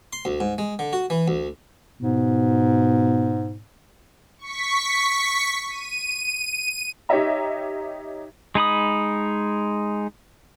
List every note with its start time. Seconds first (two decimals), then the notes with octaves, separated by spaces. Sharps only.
0.13 C6
0.25 D2
0.40 G#2
0.58 G#3
0.79 D3
0.93 F#4
1.10 E3
1.28 D2
2.01 G#2 B2
4.39 C#6 B6
5.70 D#7
7.09 D#4 G4 C#5 D#5 E5 A#5
8.55 G#3 D#4 B5 D#6